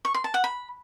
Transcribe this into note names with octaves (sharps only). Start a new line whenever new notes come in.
C#6
C6
A5
F#5
B5